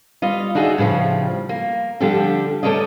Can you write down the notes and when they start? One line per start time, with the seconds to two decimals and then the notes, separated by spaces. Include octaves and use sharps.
0.22 G3 F4 D#5
0.55 D4 D#4 F#4 G#4 D#5 E5
0.78 A2 C#3 E3 F3 G3
1.49 A#3
2.00 D3 F3 G3 D4 G4 A4
2.63 A3 C#4 A4 A#4 D5 D#5